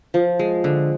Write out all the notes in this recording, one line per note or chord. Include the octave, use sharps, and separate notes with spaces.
F3
G#3
D3